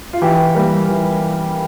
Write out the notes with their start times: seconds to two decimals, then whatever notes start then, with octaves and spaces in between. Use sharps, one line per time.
0.13 F4
0.22 E3 G4
0.55 G3 A#3
0.89 E3